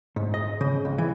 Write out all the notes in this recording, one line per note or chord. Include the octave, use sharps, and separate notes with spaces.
G#2
D#5
C#3
C#2
E3